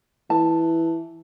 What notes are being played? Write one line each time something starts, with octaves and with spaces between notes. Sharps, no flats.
E3 A5